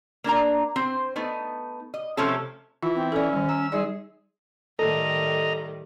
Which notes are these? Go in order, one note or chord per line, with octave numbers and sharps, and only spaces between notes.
A#3 D4 A#4 A#5
C4 C5
A3 B3 D#4
D#5
C3 F3 A3 C#4 A4
E3 F4
C4
C#4 A4 D5
D#3 G3
A#5 E6
G3 D#4 G#4 D5
A2 D#3 G3 A4 D#5 A#5